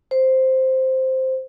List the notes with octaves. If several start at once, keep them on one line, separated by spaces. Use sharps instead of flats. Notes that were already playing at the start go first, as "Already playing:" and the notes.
C5